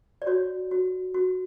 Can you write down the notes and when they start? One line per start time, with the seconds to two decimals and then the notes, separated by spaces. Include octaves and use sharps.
0.22 D5
0.27 F#4 C#5
0.71 F#4
1.14 F#4